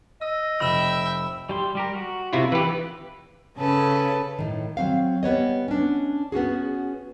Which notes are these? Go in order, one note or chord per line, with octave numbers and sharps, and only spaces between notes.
D#5 E6
F1 E5 G5 B5 E6 E7
G3 G4 C6
G3 G4 A#4
F#4
C3 E4 F4
E3 G4 B4
C#3 C#4 A4 B4
A2 D#3
F#3 C4 F5
G3 B3 C#5 D#5
C#4 D4
B3 C#4 F#4 G#4